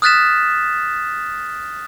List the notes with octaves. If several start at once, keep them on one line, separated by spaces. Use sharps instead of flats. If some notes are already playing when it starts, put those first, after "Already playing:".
D#6 F6 F#6 A6 B6 E7